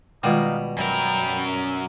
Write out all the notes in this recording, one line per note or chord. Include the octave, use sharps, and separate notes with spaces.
B2 D#3 G3 G#3 D#4 F4 F5
F#2 A#4 G5 B5